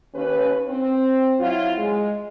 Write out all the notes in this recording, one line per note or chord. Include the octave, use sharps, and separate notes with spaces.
D#2 C#4 B4
C4
F#3 E4 F4
G#3